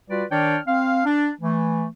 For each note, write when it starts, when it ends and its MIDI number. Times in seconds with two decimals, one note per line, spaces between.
0.10 0.25 55
0.10 0.25 65
0.10 0.25 66
0.10 0.25 71
0.10 0.25 74
0.31 0.58 51
0.31 0.58 62
0.31 0.58 73
0.31 0.58 74
0.31 0.58 79
0.31 0.58 89
0.67 1.03 60
0.67 1.03 77
1.06 1.31 62
1.41 1.86 52
1.41 1.86 57